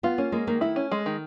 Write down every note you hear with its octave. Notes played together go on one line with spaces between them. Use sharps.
B3 F4
A#3 C#4
G#3 A#3
D#3 A#3
A3 E4
C#4
G#3
D#3